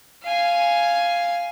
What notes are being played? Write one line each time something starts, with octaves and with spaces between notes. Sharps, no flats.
F5 G#5